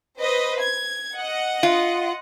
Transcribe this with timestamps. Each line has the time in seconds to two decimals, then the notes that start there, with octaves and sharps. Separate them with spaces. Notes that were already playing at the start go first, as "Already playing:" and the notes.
0.20 B4 C5 D#5
0.60 G#6
1.15 D#5 F#5
1.63 F4